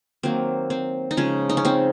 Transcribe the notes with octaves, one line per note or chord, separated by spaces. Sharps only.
D#3 F#3 A#3 C4
C4
D#4
C#3 F3 G#3 C#4
D#4
C#4
C4 D#4